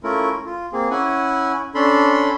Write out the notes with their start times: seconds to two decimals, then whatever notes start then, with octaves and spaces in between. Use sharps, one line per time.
0.03 A3 C#4 E4 F4 A#4
0.46 F4
0.73 A#3 C4 G#4
0.91 C#4 E4 F#5 G#5
1.75 C#4 D4 A4 B5 C6